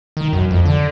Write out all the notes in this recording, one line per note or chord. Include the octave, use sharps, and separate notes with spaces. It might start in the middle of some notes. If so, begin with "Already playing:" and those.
D#3
F#2
F2
D3